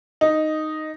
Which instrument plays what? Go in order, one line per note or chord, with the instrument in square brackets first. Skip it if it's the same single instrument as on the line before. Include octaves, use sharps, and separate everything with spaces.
[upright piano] D#4